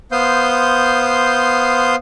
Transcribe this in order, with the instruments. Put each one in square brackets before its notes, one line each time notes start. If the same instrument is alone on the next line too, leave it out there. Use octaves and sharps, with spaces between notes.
[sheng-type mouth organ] B3 C5 F5 C6 D#6 G6